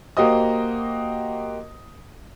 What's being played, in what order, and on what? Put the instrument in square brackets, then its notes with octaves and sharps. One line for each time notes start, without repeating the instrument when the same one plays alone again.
[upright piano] A#3 F#4 G4 C5 D#5 D#6